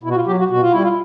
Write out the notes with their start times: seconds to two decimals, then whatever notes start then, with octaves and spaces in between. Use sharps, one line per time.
0.03 B2 E4
0.10 F#4
0.16 F4
0.27 F#3 G4
0.39 F#4
0.50 B2 F#4
0.61 F4
0.72 G3 E4
0.83 F4